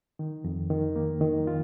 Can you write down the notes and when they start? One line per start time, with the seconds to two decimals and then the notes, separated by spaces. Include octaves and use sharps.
0.19 D#3
0.44 F2
0.70 D#3
0.96 A#3
1.21 D#3
1.47 F4